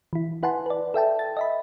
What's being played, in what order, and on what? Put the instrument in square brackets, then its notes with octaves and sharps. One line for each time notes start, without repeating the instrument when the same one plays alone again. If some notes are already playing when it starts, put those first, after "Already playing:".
[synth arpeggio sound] E3 E4
E4 B4 F#5 G#5 A5 C6
B4 D5
A4 E5 G5 A5
A6
D#5 E5 B5